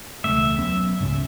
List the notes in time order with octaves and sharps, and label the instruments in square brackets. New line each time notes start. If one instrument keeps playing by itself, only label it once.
[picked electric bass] E1 C#2 A3 [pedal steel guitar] E5
[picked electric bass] F#3 B3 C#4
C#2 G#2 C#4